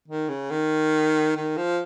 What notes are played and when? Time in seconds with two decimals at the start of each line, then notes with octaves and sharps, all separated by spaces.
0.08 D#3
0.29 C#3
0.50 D#3
1.37 D#3
1.57 F3